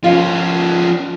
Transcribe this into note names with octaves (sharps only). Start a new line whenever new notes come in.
F3 C#4 F4